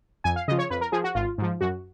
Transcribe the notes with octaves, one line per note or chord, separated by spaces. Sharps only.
F2 G#5
F5
C#3 F3 D#5
C#5
F2 B4
A#4
F3 G#4
F#4
G#1 F4
G#2 F3
F#2 F#4